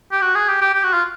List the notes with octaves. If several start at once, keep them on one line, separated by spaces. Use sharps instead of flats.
G4
F#4
G#4
G4
G4
G4
F#4
F4